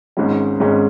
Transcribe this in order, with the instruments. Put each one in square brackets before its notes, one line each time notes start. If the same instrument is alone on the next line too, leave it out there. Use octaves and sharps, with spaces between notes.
[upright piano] G#1 G#2 G#3 C#4
G#1 G#2 G#3 C#4